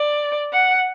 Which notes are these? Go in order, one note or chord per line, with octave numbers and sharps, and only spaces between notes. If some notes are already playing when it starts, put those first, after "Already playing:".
Already playing: D5
F#5